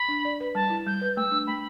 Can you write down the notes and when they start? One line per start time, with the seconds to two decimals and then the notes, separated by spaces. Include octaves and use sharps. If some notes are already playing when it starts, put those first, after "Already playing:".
Already playing: B5
0.08 D4
0.25 D5
0.40 B4
0.55 G3 A5
0.70 E4
0.86 G3 G6
1.01 B4
1.17 A3 E6
1.32 D4
1.47 A3 B5